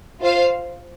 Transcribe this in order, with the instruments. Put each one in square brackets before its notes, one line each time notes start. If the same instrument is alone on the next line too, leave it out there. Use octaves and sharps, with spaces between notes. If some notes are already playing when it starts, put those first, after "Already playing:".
[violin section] F4 C5 F5